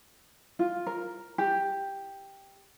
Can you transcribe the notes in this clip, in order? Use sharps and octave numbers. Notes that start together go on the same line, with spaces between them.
F4
A#4
G4